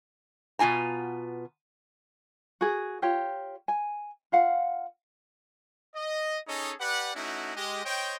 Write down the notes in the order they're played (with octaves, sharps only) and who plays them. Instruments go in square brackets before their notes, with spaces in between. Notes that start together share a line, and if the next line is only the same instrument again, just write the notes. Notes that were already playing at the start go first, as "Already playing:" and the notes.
[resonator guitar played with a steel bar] B2 B3 F4 G#5 A#5
[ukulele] F#4 G#4
F4 G4 C#5 G5
G#5
F4 F5 F#5
[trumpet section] D#5
C#4 D#4 G#4 A4 C#5 D#5
G4 B4 D5 F#5
A3 C#4 D#4 E4 F#4
G#3 G4 D#5
C5 C#5 D#5 G5